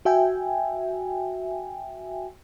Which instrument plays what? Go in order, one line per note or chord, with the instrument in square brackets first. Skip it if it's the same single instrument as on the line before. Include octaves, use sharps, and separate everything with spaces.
[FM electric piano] F#4 E5 G5 G#5